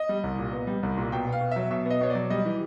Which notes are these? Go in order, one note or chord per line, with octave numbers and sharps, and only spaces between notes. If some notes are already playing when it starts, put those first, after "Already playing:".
Already playing: D#5
G3
C2
A#2
B3
G3
C2
A#2
B2 G5
B3
F5
B2
F#3 E5
B2 E5
B3 D#5
B2 C#5
F#3 D5
G3 D#5
E3